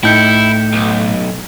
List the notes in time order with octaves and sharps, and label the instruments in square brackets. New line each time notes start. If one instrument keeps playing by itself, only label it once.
[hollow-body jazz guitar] A2 D#4 [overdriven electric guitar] E4 [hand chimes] G5 G6 C#7
[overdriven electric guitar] B1